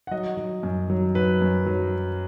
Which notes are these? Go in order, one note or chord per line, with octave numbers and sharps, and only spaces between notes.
F#5
F#3 D#5
F#3
F#2
F#3
F#3 B4
F#2
F#3